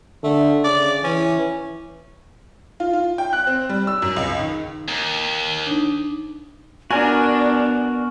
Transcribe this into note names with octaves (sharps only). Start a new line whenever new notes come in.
D3 A3
C#3 D5
E3 C#4
F4
F4
G5
F#6
C4
G3
E6
F#2
C#2
D#3
D#2
D4 D#4
B3 D4 F#4 A#4 G#5